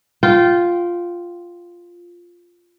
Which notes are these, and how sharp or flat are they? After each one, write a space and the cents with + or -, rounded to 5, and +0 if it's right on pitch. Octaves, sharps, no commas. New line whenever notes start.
F4 +0 G5 -20